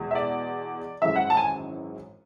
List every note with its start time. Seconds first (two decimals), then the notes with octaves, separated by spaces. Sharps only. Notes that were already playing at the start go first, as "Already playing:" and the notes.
Already playing: E2 B2 G#3
0.11 E5
0.15 D5
1.01 G#1 F#2 E3 G#3 E5
1.16 F#5
1.30 A5
1.37 G#5